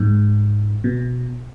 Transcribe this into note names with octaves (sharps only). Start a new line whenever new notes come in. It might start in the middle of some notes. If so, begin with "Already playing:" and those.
Already playing: G#2
B2